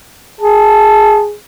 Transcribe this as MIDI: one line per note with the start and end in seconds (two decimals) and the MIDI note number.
0.41 1.34 68
0.41 1.23 81